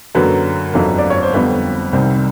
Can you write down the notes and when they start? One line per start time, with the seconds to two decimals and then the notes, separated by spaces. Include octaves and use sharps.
0.15 F#2 D3 F#3 A#3 B4
0.74 G1 F2 D3 F#3
0.98 D5
1.10 C#5
1.23 C5
1.34 F2 D3 G3 B3 B4
1.93 C2 C3 D#3 G3 C4 C5